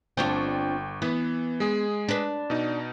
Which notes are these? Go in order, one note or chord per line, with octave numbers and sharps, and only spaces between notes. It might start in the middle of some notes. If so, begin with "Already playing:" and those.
G1 C4 D4 F4 G5 C#6
E3 B3
G#3 G#4
D4 B4
B2 D#4